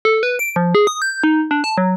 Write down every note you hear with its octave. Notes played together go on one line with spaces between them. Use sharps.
A4
B4
D7
F3
G#4
D#6
G6
D#4
D4
A5
F#3